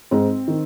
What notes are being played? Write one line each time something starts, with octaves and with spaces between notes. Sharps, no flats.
G#2 C4
D#3